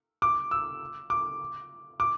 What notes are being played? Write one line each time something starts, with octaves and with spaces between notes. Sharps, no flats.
D6
E6
D6
D6